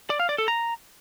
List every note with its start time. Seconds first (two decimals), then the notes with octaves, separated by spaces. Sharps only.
0.10 D5
0.19 F5
0.29 D5
0.38 A4
0.48 A#5